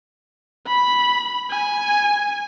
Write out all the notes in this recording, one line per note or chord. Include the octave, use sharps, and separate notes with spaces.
B5
G#5